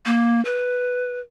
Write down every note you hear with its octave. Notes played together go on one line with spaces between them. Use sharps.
A#3
B4